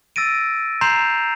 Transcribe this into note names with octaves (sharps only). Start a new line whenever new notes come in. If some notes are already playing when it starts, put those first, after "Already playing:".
E6 A6 A#6 D7 D#7
A#5 C6 G6 C7 E7 F7